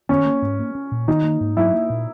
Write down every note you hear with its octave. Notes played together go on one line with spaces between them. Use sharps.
D#3 C#4
A#3
G#2
A#3
C#4
A#2
D#3 D#4
A#3
G#2
F#3 E4
A#3
A#2